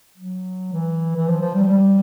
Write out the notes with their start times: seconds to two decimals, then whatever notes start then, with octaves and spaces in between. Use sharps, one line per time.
0.18 F#3
0.73 E3
1.16 E3
1.28 F3
1.41 F3
1.55 G3
1.68 G3